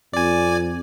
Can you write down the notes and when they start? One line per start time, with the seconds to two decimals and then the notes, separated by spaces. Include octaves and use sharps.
0.13 F2 D5 G#5